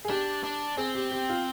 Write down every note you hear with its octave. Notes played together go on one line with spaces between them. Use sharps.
G#4
D4 G4
D4
C4 G#4
G4
G4
F4